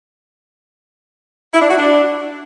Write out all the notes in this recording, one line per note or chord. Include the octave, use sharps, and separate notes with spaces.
E4
D4
F#4
D4